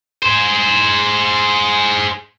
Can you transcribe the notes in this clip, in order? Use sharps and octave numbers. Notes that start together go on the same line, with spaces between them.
G#4 C5